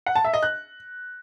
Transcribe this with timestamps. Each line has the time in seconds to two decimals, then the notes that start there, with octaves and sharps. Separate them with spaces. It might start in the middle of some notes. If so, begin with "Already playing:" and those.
0.06 F#5
0.15 A5
0.25 E5
0.34 D#5
0.43 F#6